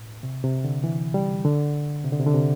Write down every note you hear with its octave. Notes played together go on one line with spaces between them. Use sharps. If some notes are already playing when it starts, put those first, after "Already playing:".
Already playing: A2
C3
C3
D3
E3
G3
D3
C3
D3
C3
D3
C3